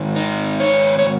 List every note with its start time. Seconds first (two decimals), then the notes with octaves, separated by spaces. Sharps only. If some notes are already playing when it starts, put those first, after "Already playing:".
Already playing: G#2 D#3
0.16 D#4
0.60 C#5
0.99 C#5